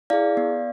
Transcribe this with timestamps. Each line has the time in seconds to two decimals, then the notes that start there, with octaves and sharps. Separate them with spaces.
0.10 E4 G#4 D5 F5
0.37 B3